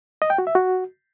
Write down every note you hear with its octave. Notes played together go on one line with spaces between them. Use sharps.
D#5
G5
F#4
E5
F#4